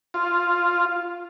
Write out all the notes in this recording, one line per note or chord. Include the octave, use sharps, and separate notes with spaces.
F4